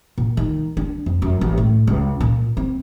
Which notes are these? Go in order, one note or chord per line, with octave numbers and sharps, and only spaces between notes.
A#2
D#3
D4
F2
F#2
A1
A2
C#2
A#2
C4